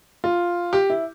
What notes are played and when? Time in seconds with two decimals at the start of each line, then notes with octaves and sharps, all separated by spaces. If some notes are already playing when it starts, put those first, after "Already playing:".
0.24 F4
0.73 G4
0.90 E4